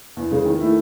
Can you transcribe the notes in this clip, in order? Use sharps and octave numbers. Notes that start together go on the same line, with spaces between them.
E2
C#3 G#3
D#3
A3 E4